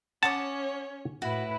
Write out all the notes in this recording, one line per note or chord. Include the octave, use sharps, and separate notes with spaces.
C#4 C#5 F#5 A5 D6 D#6
A2 E4 F#4 B4